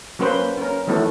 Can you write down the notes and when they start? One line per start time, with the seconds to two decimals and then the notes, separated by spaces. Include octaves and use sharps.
0.19 F#3 A#3 C#4 B4 C5
0.58 C#4 A#4
0.87 D#3 E3 F#3 A3 B3 A4